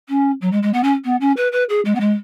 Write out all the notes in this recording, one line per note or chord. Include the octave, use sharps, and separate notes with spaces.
C#4
F#3
G#3
G#3
B3
C#4
B3
C#4
B4
B4
G#4
G#3
B3
G#3